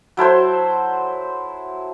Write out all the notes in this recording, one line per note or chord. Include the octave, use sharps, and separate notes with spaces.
F#3 E4 A4 C5